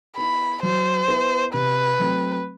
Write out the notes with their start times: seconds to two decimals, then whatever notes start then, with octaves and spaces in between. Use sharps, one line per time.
0.17 B3 E4 B5
0.63 F#3 C5
1.08 B3 E4
1.53 C3 B4
2.00 F#3 A3 C4